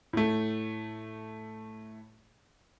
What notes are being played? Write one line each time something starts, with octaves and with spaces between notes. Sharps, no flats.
A2 A3